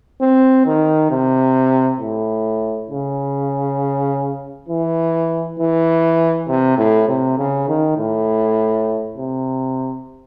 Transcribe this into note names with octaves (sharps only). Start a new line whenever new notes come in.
C4
D#3
C3
A2
C#3
E3
E3
C3
A2
C3
C#3
D#3
A2
C3